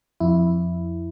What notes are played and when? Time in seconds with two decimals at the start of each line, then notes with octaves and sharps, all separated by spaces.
0.20 F2 E4